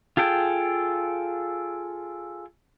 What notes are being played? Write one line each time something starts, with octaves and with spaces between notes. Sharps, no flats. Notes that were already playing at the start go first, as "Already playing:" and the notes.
F4 G#4 A4 G5